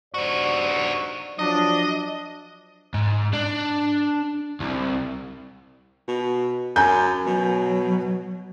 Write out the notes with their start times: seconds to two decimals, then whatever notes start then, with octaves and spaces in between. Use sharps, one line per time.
0.14 G2 D#4 F#4 C5 D5
1.39 F3 F#3 D4 D#5
2.94 G#2
3.33 D4
4.60 C2
6.08 B2
6.76 F#2 G#5 A#5 G6
7.26 B2 F#3